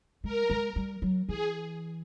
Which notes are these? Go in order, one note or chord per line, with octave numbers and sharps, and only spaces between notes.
G#3 A#4
G#3
G3
F#3
E3 G#4